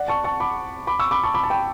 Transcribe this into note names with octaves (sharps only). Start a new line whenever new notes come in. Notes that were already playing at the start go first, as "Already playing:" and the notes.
Already playing: D5 F#5
A5 C#6
A5 C#6
B5 D6
B5 D6
C#6 E6
B5 D6
A5 C#6
B5 D6
A5
G5 B5